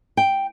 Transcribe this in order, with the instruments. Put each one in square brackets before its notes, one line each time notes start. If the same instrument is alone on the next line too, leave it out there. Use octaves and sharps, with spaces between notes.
[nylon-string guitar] G5